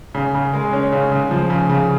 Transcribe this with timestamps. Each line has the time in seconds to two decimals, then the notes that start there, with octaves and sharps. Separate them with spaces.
0.15 C#3
0.35 C#3
0.53 G#3
0.73 C#4
0.92 C#3
1.12 C#3
1.31 F3
1.50 C#3
1.70 C#3